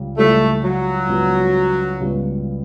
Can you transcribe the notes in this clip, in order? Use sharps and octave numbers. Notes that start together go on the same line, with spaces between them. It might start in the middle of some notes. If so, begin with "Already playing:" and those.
Already playing: C#2 C#3 G3
C#2 C#3 G3 A3 C#4 E4
F#3
C#2 C#3 G3 B3
C#2 C#3 G3 B3